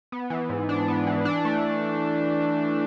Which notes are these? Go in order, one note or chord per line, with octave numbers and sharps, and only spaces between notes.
B3
E3
G#2
D4
B3
E3
D4
A3